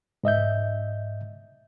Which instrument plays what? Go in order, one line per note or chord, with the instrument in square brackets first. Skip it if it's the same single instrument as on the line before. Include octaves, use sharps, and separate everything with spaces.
[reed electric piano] G#2 D#5 E5 G6